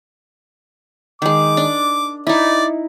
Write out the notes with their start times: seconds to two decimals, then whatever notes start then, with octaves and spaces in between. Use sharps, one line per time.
1.22 D#3 G#3 D6
1.57 D4
2.27 D#4 E4 D5